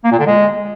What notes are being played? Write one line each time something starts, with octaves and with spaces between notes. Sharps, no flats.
A#3
A#2
D3
G#3